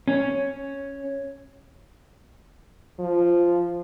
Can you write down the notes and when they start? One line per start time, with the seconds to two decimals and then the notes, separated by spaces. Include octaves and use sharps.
0.08 C#4
2.99 F3